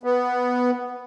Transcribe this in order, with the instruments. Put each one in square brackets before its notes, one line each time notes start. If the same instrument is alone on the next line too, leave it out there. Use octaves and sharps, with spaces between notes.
[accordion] B3